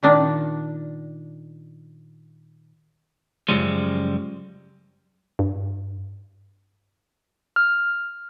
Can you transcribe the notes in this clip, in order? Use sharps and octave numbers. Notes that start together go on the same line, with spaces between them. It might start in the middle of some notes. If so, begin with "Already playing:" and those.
A#2 D#3 D4
F#2 C#3 F3 G3 G#3
G2
F6